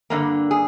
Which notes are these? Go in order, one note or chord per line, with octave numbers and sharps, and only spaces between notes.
G2 D3 F3 A#3
G#4